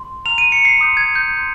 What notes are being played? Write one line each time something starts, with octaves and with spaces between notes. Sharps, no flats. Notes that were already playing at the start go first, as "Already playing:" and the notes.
Already playing: C6
A#5 F6 F7
D#7
C#7
C7
C6 D#6 G6
G#6
G6
C6 G6